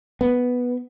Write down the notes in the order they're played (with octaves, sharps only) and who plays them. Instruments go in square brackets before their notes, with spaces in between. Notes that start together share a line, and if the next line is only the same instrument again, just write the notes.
[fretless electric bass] B3